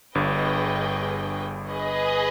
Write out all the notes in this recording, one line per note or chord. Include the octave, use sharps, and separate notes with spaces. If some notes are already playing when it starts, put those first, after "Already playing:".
G1 G2 G#4 B4 D#5 G5
G#4 B4 D#5